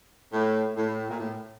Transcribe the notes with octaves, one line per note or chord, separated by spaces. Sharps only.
A2
A2
A#2
A2